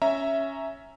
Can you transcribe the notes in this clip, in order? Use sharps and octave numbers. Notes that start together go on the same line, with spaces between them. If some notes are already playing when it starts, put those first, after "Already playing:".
C#4 E5 A#5